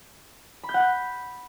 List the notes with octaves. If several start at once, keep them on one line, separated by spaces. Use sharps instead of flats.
B5
G6
F#5
G6